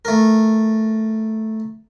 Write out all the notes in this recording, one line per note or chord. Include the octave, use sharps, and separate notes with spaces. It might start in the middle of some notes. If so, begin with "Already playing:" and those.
A3 A#4